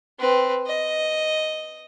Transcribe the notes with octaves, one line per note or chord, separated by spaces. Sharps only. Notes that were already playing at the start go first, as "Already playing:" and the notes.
C4 B4
D#5